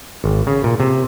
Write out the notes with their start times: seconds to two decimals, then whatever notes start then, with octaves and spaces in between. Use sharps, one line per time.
0.24 G#1
0.47 C#3
0.64 A#2
0.80 C3